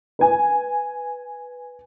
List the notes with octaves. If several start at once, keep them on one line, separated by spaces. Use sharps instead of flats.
B4 G#5